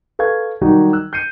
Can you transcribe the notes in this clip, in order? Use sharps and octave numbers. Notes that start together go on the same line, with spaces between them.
A4 B4 F5 C#6 G#6
D#3 F#3 G3 D#4 F#4
E6 F#6
G6 C7 C#7 D#7